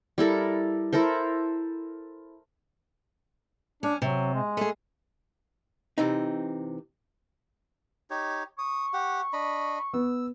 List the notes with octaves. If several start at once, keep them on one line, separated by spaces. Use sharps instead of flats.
G3 E4 A4 A#4
E4 A4 A#4 C5
C#4 D4
C3 F#3
G#3
A3 G#4
C3 E3 C4 D#4
D#4 G4 C#5
C#6 D#6
G4 F#5
D4 D#5 B5
B3 E6